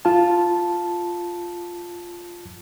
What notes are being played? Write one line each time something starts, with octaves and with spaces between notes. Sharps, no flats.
F4 A5